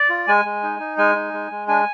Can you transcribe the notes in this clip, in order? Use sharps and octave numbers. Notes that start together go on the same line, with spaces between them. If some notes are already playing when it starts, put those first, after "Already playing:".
Already playing: D5
F4
G#3 G#5
G#3
D#4
D#4
G#3 G#5
D#4
G#3
G#3
D4 G#5